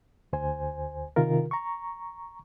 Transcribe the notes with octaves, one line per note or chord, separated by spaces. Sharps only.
D2 C5 G#5
C3 D#3 F4 A#4
A#5 C#6